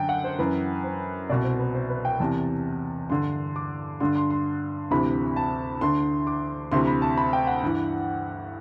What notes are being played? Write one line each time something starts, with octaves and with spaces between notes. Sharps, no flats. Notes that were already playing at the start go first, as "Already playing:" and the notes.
Already playing: F#2 D3 G5
F#5
C5
F#2 E3 B4
C5
C2 B2 D5
C5
B4
C5
B4
G5
E2 C3 E3 A5
G2 D3 C6
D6
G2 D3 C6
C6
C6
D2 C3 E3 B5
A5
D2 D3 C6
D6
D2 C3 E3 C6
B5
A5
B5
G5
F#5
G2 E3